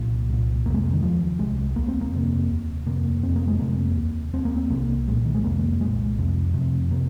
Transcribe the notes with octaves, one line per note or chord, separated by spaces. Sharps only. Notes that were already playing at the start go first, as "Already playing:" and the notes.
Already playing: C2 A#2
C2 A#2
F2 C3 G#3 A#3
D#3
D#2 F3
C2 C3 G#3
D#2 A#3
C4
A#3
F2 C3
D#2
F2 C3 A#3
F2 C4
C3
A#3
G#3
F2 C3 A#3
D#2
D#2 C4
A#3
C4
C2 C3 A#3
C2 A#2 G#3
D#3
G#3
F2 C3 A#3
C2 A#2 G#3
F2 C3
F2 C3
C3 A#3